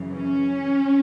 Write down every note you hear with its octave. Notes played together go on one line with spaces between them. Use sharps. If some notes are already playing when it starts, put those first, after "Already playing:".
Already playing: F#2 C#3 E3
C#4